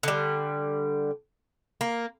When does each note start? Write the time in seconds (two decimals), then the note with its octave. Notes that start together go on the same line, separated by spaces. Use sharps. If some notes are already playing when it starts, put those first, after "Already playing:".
0.03 D3 G3
1.81 A#3